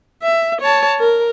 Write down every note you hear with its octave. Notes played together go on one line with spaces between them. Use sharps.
E5
C#5 A5
A#4